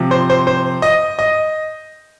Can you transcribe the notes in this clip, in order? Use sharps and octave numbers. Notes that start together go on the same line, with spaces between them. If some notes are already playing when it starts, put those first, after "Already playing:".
Already playing: C3 F3
C5
C5
C5
D#5
D#5